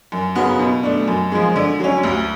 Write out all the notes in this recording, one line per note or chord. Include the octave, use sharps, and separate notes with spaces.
F#2
C#3 F#3 B3
B2
A3 D4
F#2
F3 G#3
D3
F#3 C#4
D2